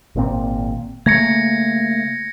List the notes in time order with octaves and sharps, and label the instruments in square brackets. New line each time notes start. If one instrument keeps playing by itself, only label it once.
[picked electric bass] G#1 A#2 C4
[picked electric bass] C#3 A3 A#3 [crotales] G#6 A#6 C#7